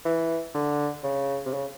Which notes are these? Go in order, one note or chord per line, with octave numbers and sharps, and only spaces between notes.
E3
D3
C#3
C3
C#3